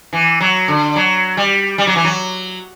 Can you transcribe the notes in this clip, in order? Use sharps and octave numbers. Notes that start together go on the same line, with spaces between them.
E3
F#3
D3
F#3
G3
G3
F#3
E3
F#3